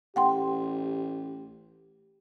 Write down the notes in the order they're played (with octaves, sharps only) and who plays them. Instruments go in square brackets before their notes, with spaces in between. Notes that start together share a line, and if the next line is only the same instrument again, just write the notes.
[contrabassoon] A1 [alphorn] G4 [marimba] F#5 G5 C6